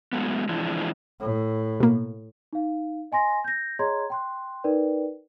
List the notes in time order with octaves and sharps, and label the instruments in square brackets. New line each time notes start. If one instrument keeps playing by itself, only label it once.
[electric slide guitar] F#3 G#3 A3 B3
E3 F3 G#3 C4 D4 E4
[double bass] A2
[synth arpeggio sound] B2 A#3
[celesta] D#4 F5
D#5 G#5 C6 A#6
G6 A#6
G#4 C#5 D#5 A#5 C6 G#6
G5 C6 F#6
D#4 A#4 B4 D5 G5